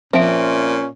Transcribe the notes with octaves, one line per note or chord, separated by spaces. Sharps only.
A#2 F3 C4 C#4 E5 D7